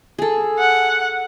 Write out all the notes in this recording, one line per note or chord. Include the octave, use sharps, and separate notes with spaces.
G#4 A4
F#5